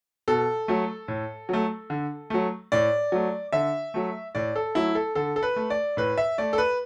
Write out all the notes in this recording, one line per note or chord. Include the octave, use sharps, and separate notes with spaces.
B2 A4
F#3 A3
A2
F#3 A3
D3
F#3 A3
A2 D5
F#3 A3
D3 E5
F#3 A3
A2 D5
A4
F#3 A3 E4
A4
D3 A4
A4
B4
A3
D5
A2 B4
E5
A3 D5
A4
B4